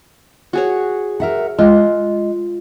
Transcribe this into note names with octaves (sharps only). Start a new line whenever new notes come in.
F#4 G#4 C#5
A#4 E5 F#5
G#3 F4